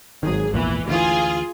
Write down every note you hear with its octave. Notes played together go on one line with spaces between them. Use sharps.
G#1 D#3 F#3 G#4
A#1 E2 A#2 E3
D2 E3 F4 G#4